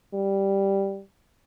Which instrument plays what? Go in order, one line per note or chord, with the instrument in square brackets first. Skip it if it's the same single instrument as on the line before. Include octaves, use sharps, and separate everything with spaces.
[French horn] G3